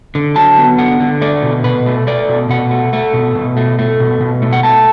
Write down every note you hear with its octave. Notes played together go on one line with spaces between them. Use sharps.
D3
F#3 A5
B3
D3 F#5
D3
A3 D5
B2
B2 B4
A3
A3 D5
B2
B2 F#5
A3
A3
B2
B2
A3
A3
B2
B2
A3
F#5
A3 A5